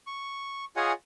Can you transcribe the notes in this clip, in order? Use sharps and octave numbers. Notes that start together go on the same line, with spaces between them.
C#6
F4 G#4 C#5 D#5 F#5 G#5